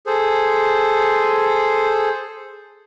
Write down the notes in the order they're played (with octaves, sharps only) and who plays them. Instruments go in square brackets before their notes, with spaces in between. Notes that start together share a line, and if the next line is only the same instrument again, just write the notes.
[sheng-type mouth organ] G#4 A4 C5